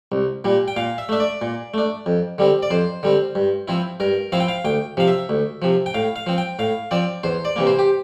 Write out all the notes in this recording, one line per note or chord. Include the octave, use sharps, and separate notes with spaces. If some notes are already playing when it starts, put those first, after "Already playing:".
C2
A#2 G3
G5
A#2 F5
E5
A3 D4 E5
D5
A#2
A3 D4
F2
D3 G3 C4
D5
F2 C5
D3 G3 C4
G2
F3 C4 E4
G2 A#4
F3 C4 E4 F5
G5
F5
D2 G5
C3 F3 F5
E5
D2
C3 F3
G5
A2 F5
F5
F3 C4
G5
A2 F5
F3 C4 D5
E2 C5
D5
C3 E3 A#3
C5
G4